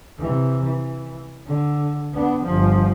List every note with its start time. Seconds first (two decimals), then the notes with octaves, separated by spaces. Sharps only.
0.19 C3 E3
0.64 E3
1.46 D3
2.14 B3 D4
2.43 G1 F3